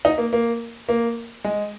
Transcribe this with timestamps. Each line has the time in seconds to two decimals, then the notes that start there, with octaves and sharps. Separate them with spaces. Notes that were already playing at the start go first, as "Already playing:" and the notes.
0.05 D#4
0.18 A#3
0.33 A#3
0.89 A#3
1.45 G#3